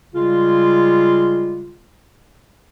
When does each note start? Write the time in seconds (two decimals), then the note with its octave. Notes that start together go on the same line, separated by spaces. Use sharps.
0.14 C#3 G3 G#3 F4